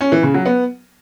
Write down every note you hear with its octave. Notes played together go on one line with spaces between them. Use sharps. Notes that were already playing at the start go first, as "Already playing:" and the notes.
C#4
E3
C#3
F#3
B3